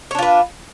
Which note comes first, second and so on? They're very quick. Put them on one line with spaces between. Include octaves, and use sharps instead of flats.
C#5 D4 F4 B4